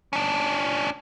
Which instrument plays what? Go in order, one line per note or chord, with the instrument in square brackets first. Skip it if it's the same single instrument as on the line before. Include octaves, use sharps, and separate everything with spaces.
[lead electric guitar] C#4 D4